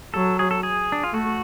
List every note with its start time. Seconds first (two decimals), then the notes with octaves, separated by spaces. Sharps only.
0.14 F#3 A4
0.39 G#4
0.51 A4
0.63 G#4
0.92 D4
1.04 F4
1.13 A3 F#4